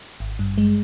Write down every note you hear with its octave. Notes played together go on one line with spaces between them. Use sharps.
G#1
G2
G#3